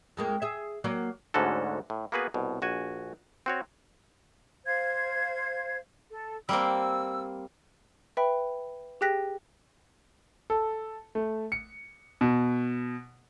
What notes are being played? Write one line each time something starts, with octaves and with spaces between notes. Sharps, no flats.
F2 G#3 A#3
G#4 E5
F#3 A#3 D5
D2 G#2 D3 C#4 F#4 A4
A2
A#3 B3 F#4 G#4 B4
C2 B2
A#1 F#4 G#5
C4 F#4 C#5
C5 F5 G#6
A4
G3 A#3 C4 E6
B4 E5 G5 B5
G4 G#4 G5 F#6 A#6 B6
A4
A3
C#7
B2